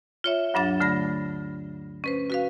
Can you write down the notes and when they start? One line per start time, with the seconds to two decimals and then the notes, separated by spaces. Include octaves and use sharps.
0.24 F4 C#5 E5
0.54 D2 G2 F#3 D4 A6
0.80 D3 A3 B5 A#6
2.04 C#4 B4 C5
2.30 F#4 B4 F5